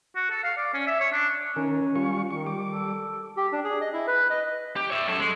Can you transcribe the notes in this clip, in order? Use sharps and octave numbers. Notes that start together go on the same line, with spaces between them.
F#4
A4
F5
D5
C#4
E5
C#5
D4
D#3 C#4 A#4
G3 F4 C#6
D#3 C#6
G3 D6
A4
G4
D4
G#4
D#5
E4
B4
D#5
G4
C#5 E5
F#2 A4
G#3